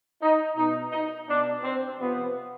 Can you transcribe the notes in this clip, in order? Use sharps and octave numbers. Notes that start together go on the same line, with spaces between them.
D#4
B2 D#4
D#4
B2 D4
C4
C3 F3 B3